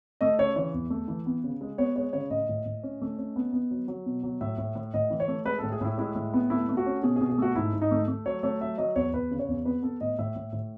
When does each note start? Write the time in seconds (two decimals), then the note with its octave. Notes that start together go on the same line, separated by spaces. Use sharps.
0.21 A3 D#5
0.38 C#3 C#5
0.56 E3 C#5
0.74 E2
0.90 A3
1.08 E3
1.26 B3
1.44 C#3
1.61 G#3
1.78 B3 C#5
1.95 G#3 C#5
2.13 C#3 C#5
2.30 A2 D#5
2.49 A2
2.66 A2
2.83 C#4
3.01 A3
3.18 C#4
3.36 B3
3.53 B3
3.71 F#3
3.88 F#3
4.06 B2
4.23 F#3
4.41 A2 E5
4.58 A2
4.75 A2
4.94 A2 D#5
5.10 E3
5.20 C#5
5.28 A3
5.45 G#3 B4
5.58 A4
5.63 A2
5.72 G#4
5.81 A2 E4
5.98 G#3 E4
6.15 A2
6.34 B3
6.50 A3 E4
6.69 A3
6.77 F#4
6.86 C#4
7.03 B2 G#4
7.16 G#4
7.21 B2
7.30 G#4
7.38 A3 F#4
7.55 G#2 E4
7.73 G#2
7.82 D#4
7.91 A3
8.08 A3
8.26 F#3 C#5
8.43 A3 C#5
8.61 F#3 E5
8.78 F#3 D#5
8.96 E2 C#5
9.13 E2 B4
9.31 C#3
9.39 C#5
9.48 E2
9.65 B3 B4
9.83 B3 A4
10.01 A2 D#5
10.19 A2 E5
10.36 A2
10.53 A2